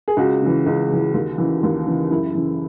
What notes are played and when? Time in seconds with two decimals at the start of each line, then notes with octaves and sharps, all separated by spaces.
0.08 G#4
0.17 C#2 F#4
0.42 C#3 E3
0.66 C#2
0.90 C#3 E3
1.14 D#2
1.38 C#3 E3
1.63 D#2
1.87 C#3 E3
2.11 F#2 E4
2.35 C#3 E3